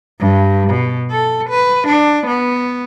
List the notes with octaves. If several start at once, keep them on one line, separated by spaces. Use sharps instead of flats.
G2
B2
A4
B4
D4
B3